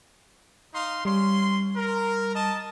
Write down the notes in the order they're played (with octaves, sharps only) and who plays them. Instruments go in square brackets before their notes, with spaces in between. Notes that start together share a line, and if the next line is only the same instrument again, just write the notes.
[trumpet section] D#4 F5 C6
[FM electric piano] G3 [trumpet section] C#4 C6
[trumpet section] A#4
D#5 A5